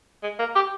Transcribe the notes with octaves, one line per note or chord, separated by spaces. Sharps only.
G#3
A#3
G4